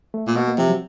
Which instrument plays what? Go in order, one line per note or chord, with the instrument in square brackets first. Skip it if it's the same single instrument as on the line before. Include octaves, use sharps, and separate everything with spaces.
[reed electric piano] A3
[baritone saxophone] A#2
[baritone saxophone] B2 [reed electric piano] A#3
[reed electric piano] A#3
[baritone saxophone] C3 [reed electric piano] F3
[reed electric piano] F#3